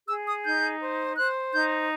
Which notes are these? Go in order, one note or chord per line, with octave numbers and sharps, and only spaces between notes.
G#4 E6
D#6
D#4 G6
C5
C5 F#6
D#4 G6